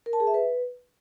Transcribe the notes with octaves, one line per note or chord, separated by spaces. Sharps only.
A#4
A5
G#4
E5
B4